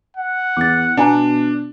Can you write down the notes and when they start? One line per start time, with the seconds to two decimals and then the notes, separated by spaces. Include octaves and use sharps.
0.16 F#5
0.57 E2 D6 A6
0.97 B2 B3 D4 G#5 A#5